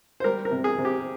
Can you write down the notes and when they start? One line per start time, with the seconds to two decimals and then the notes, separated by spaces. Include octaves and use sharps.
0.20 C5
0.24 G3 A#4
0.45 A#4
0.51 C3
0.64 G#4
0.78 C3
0.85 G4